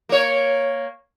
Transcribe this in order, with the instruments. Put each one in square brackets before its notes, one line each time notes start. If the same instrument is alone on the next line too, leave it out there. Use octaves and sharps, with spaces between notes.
[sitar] A#3 C#5